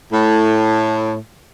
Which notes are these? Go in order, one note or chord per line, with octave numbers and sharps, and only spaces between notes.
A2